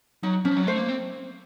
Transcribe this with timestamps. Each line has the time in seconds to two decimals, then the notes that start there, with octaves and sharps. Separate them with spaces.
0.23 F#3 D#4
0.45 F3 C#4
0.56 F#3
0.67 A3 C5
0.77 A#3
0.88 C4